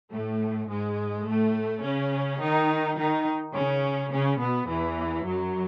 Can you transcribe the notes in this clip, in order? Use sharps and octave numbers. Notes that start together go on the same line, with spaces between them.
A2 A3
G#2 G#3
A2 A3
C#3 C#4
D#3 D#4
D#3 D#4
C#3 C#4
C#3 C#4
B2 B3
E2 E3
F#2 F#3